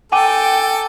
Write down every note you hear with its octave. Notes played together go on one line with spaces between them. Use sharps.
A4 G5 G#5 D6 D#7